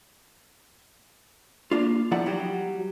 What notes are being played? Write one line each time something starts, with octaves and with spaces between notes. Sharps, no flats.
A#3 D4 F4
E2 F3 E4 D5 F#5 A#5
F#3 G3 F#4 G4